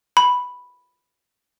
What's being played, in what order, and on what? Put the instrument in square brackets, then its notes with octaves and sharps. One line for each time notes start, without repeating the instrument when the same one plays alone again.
[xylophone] B5